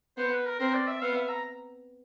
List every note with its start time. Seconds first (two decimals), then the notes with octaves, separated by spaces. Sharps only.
0.18 B3 C5
0.32 B4
0.46 A#4
0.60 C4 A#4
0.74 D5
0.88 E5
1.01 B3 F5
1.15 E5
1.29 A#5